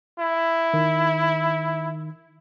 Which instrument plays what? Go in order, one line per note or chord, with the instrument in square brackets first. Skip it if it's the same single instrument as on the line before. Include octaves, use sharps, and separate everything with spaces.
[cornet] E4
[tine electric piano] D#3